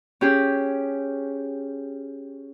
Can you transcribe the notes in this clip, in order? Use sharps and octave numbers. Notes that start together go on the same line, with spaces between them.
C#4 G4 G#4